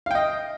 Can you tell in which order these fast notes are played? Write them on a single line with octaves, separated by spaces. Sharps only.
F5 G5 D#5